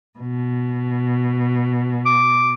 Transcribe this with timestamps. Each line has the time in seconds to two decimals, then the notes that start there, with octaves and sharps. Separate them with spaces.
0.18 B2
2.06 D6